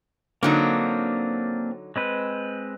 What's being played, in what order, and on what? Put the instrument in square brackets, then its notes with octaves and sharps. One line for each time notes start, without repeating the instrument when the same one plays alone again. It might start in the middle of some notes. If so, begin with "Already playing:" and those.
[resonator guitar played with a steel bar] D3 F#3 D#4 [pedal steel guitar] A#3 C4 D4
[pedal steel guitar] G#3 C4 B4